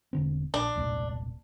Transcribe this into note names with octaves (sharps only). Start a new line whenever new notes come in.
E1 D3 C4
A#1 D4
E1 C2 A#2